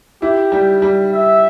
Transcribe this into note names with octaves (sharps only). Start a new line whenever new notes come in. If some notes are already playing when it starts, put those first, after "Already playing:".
E4 G4
G3
G3
E5